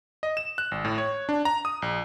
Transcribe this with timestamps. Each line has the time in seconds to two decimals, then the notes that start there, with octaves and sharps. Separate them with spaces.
0.23 D#5
0.37 E7
0.58 F#6
0.71 G#1
0.85 A2
0.98 C#5
1.29 D4
1.45 A#5
1.65 D#6
1.82 A#1